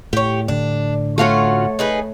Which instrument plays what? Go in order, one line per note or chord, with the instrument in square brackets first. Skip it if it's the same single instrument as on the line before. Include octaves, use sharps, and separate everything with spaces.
[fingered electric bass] A2 [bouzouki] G4 C#5
[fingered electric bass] A2 D3 [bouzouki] D4
[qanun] A3 C#5 [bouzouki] C#4 F4 F#4
[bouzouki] D#4 G#4 B4